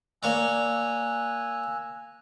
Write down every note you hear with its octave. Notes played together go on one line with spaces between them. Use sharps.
A#3 C#5 D5 G#5 E6 F#6